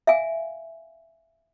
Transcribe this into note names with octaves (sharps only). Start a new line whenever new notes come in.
E5 F5 G#5